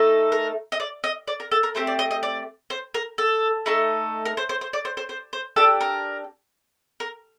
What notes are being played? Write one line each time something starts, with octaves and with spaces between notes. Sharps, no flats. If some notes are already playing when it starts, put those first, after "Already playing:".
Already playing: A3 D#4 A4
A#4
D#5
D5
D#5
D5
A#4
A4
A#4
A3 C4 G4 C5
D5
D#5
D#5
D5
C5
A#4
A4
A3 D#4 A4
A#4
C5
C5
C5
D5
C5
C5
C5
C5
D4 G4 A4
A#4
A#4